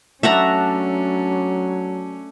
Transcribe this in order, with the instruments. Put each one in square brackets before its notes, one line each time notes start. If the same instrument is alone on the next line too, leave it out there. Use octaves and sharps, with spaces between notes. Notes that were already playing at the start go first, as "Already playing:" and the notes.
[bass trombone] F#3 [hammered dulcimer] A3 D4 A5 [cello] C#4 [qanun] E5 F#5 A#5